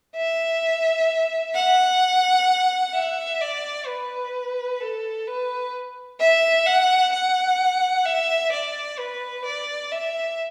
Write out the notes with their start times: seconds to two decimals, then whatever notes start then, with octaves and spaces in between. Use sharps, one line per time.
0.16 E5
1.55 F#5
2.94 E5
3.41 D5
3.87 B4
4.80 A4
5.27 B4
6.20 E5
6.66 F#5
7.12 F#5
8.05 E5
8.52 D5
8.98 B4
9.45 D5
9.92 E5